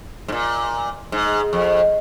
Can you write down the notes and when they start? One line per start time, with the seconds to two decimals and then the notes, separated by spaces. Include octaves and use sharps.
0.28 G#2
0.32 A#2
1.12 G#2
1.53 F2